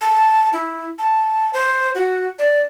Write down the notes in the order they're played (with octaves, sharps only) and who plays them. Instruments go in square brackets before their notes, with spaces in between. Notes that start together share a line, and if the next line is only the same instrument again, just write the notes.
[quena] A5
E4
A5
C5
F#4
D5